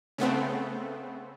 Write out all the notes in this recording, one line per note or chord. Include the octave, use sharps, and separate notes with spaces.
C#3 A3 B3 C4